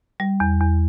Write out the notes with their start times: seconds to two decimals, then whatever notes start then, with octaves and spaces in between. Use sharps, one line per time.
0.20 G3
0.40 E2
0.61 E2